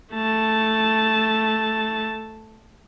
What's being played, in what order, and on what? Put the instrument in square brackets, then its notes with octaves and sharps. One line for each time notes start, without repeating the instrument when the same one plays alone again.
[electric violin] A3 A5